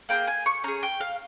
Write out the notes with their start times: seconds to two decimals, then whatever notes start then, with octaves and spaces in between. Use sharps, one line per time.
0.09 A#3 D#4 G#4 G5
0.27 G#5
0.46 C#6
0.64 C#4 G#4 A#5
0.83 G5
1.00 F5